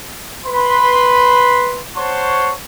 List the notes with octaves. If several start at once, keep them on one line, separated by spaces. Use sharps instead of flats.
B4 B5 C6
C5 C#5 F#5 A5 C6 C#6